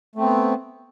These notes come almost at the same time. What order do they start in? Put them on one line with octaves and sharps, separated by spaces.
A3 C4 B3